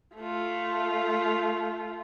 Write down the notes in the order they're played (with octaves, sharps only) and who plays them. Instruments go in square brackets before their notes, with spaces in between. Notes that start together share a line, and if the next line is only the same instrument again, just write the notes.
[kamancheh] A3 F4